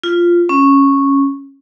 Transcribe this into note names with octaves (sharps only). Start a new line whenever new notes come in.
F4
C#4